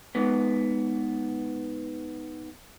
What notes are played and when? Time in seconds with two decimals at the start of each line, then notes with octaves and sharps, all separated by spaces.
0.15 G#2 B3